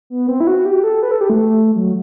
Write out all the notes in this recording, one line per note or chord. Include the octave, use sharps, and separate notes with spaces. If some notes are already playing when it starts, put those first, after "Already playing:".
B3
C4
E4
F#4
G4
A4
B4
A4
G4
A3
F#3